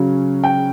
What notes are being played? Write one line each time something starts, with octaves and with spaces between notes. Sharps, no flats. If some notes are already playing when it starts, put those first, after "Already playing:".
Already playing: C#3 F#3 C#4
G5